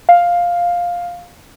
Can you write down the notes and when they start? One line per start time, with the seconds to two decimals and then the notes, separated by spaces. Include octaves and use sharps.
0.09 F5